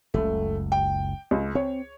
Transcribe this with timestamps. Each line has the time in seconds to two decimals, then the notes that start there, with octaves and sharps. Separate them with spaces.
0.14 F#1 C#2 A3
0.72 G5
1.31 C#2
1.55 C4 C#5